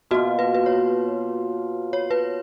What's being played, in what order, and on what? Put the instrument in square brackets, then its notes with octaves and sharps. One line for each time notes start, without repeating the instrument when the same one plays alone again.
[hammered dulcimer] B2 A#3 F4 [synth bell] F#4
[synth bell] B4
B4
C#5
C#5
B4